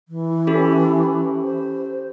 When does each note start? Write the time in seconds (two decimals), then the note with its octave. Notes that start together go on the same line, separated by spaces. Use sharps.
0.08 E3
0.47 C#4 G4 A4
1.42 C5